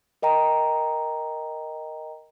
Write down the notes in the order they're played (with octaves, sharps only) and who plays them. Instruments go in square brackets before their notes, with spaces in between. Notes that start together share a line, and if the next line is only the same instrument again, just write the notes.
[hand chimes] A#4 D#5 G5 A#5